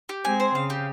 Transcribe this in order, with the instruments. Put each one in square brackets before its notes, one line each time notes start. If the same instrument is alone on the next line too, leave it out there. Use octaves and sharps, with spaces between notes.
[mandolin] G4
[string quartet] G#3 C4 [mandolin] G#5
[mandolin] C5
[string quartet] C#3 [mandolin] F5
[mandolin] G4